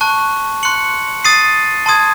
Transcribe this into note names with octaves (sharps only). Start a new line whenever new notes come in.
A5 C#6 F#6
C6 F#6 C#7 F#7
D#6 A6 C7 D#7
A5 C6 D#6 G#6